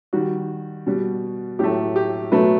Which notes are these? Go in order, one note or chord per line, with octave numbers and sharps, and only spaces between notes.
D#3 G3 F#4
B2 G3
A2 F#3 A3 G4
G4
B2 F#3 A3 B4